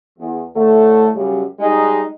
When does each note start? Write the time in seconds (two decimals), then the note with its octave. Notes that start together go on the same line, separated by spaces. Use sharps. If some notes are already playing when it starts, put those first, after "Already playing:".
0.18 E2
0.55 A2 D3 A3
1.14 F#2 C#3 G3
1.58 G3 G#3 D#4